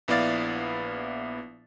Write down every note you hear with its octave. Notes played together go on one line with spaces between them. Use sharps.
A#1 B3 E4 D5 F5 A6